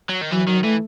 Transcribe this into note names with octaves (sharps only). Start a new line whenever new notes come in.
F#3
D#3
E3 F#3
D#3 F#3
E3 A3